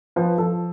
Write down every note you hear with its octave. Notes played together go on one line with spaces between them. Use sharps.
F3 B4
F3 A4